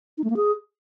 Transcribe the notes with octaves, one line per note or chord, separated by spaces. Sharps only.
D#4
A3
A#3
G#4